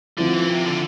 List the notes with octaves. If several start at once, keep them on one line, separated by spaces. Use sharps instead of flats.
D3 F3 C4 E4
E3
C3
D3